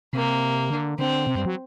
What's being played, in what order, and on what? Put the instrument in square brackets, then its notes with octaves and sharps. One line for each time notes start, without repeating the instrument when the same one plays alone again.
[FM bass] C3 [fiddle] A#3
[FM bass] D3
[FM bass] D3 [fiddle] C4
[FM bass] C3
G2
F#3